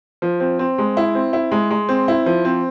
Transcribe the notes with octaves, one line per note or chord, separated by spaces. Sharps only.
F3
C4
C4
G#3
E4
C4
E4
G#3
G#3
C4
E4
F3
C4